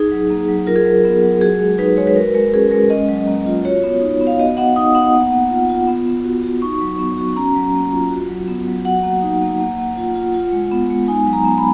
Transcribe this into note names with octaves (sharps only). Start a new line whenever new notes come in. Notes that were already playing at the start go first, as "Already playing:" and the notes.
Already playing: D#4 G#4
F#3
A#3
F#3
F4 A#4
G#4
F#3 A#4
B3
F#3
F#4 G#4
G#3
D#4 B4
G#3 C#5
B4
F#4 A#4
G#3 A#4
C#4 G#4
G#3 A#4
C#4 D#5
F#3
A#3
F4
F#4 C#5
B3
D#4
B3
F5
F#4 D#5
B3 F#5
D#4 D#6
B3 F#5
A#3
A#3
F4
F4
B3
B3
F#4
F#4
D#4 C#6
F#3
B3
F#4
C#4 A#5
F#3
A#3
F4
F#4
F#3
B3
F#3
F#4 F#5
A#3
D#4
A#3
A#3
A#3
F4
F4
F4
G#3
B3
G#3
D#4 G#5
F#3
A#5
B3
B5